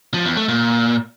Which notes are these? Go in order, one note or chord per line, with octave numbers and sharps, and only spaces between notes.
F3
E2
A3
A#2